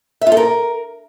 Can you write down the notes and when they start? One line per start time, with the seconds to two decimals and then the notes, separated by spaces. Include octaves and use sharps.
0.21 E5
0.27 F4
0.32 A4
0.37 A#4